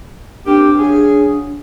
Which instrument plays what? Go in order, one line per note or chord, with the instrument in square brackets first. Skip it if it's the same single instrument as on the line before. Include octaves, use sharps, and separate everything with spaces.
[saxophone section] A#3 C4 G4 [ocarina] D4
[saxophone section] C#3 F#3 G#4